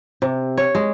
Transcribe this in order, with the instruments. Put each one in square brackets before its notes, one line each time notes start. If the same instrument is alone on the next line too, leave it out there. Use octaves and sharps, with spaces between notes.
[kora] C3
C#5
G#3